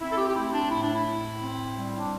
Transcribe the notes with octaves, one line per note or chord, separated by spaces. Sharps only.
C4 E4
A4
G4
G4
A3 E4
D4
A2 E4
D4
E4
A2
C4
G3
D4